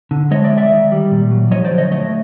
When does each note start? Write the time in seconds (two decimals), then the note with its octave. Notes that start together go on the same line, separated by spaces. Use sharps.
0.11 D3
0.31 G#3 C#5 D#5
0.44 D5 E5
0.51 G#3
0.58 D5 E5
0.71 D#3
0.92 G3
1.11 A#2
1.31 F#3
1.51 F3 C#5 D#5
1.65 C5 D5
1.71 D3
1.78 C#5 D#5
1.91 A3 C#5 D#5